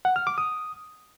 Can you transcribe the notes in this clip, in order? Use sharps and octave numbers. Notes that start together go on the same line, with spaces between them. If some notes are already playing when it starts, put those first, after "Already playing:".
F#5
F6
D6
D#6